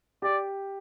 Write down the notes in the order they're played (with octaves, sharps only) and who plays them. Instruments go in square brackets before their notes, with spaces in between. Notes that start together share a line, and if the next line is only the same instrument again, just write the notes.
[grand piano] G4 [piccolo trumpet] D5